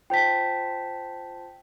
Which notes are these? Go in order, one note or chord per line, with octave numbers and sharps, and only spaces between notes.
F4 C5 G5 A5 B6